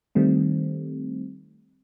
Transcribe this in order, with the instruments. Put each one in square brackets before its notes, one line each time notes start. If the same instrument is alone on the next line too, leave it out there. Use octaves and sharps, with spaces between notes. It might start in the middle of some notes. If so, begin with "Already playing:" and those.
[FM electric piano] D#3 G3 A3 C4